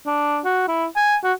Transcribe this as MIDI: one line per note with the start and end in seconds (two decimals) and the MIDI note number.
0.06 0.38 62
0.45 0.63 66
0.68 0.85 64
0.96 1.16 80
1.24 1.33 66